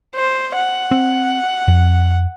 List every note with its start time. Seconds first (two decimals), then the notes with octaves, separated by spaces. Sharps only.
0.16 C5
0.56 F#5
0.91 C4
1.68 F2